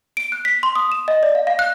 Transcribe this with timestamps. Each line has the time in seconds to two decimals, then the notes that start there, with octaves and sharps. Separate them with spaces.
0.17 D7
0.32 F#6
0.45 B6
0.63 C6
0.76 D#6
0.92 E7
1.08 D#5
1.23 D5
1.35 F5
1.47 F5
1.59 F#6